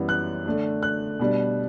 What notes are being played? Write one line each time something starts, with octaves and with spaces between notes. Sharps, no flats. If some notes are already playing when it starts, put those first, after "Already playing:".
Already playing: F#2 E3 G3 B3
F#6
D3 A3 D4
F#6
B2 G3 D4